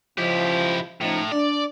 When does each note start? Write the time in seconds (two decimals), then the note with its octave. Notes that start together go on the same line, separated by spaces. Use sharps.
0.18 C#3 F3 E4 G4 D#5
1.01 A2 C#3 F3 D#4
1.32 D4 D5